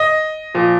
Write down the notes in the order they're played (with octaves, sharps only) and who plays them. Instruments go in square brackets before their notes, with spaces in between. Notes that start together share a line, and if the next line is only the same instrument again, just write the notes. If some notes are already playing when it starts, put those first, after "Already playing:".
Already playing: [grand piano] D#5
A#2 F3